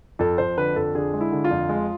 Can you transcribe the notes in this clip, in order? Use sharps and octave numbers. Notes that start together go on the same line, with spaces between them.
F2 A4
F2 C5
D3 B4
F2 A4
D3 G#4
G#3
E4
D3
F4
F2
G#3